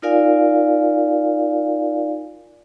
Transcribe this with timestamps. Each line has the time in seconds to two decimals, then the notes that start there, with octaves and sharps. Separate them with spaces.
0.02 D#4 F4 A#4 D5 F5 G#5